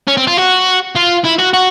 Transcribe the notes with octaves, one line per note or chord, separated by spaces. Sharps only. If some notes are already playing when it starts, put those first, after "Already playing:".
C#4
C4
F4
F#4
F4
E4
F#4
F#4